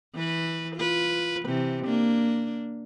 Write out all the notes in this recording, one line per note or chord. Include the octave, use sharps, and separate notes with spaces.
E3 B4
F4 B4
C3 E3
A#3 D4